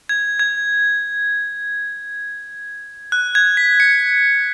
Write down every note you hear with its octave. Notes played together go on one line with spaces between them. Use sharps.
G#6
G#6
F#6
G#6
B6
C#7